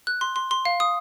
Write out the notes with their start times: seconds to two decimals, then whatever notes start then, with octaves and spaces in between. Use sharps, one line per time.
0.07 F#6
0.21 C6
0.36 C6
0.51 C6
0.65 F5
0.80 D#6